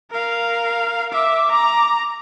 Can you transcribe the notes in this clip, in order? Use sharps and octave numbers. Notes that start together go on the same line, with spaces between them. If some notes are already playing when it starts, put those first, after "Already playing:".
A#4 F5
E5 D6
A#5